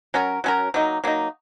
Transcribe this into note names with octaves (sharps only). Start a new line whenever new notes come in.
F#3 C#4 F#4 A#4
F#3 C#4 F#4 A#4
F#3 A#3 D#4
F#3 A#3 D#4